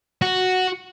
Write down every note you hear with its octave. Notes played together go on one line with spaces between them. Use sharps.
F#4